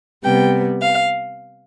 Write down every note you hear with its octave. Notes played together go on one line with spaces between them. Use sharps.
C3 G3 B3 G5
F5